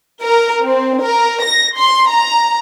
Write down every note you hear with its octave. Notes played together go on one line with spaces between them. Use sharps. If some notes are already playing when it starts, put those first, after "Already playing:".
A#4
C4
A#4
A#6
C6
A#5